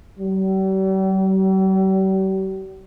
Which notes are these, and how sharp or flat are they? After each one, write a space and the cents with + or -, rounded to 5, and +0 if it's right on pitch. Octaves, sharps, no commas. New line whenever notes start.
G3 -45